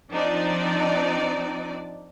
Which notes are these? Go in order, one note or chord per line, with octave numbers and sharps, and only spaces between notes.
F3 C4 D4 D#4 D5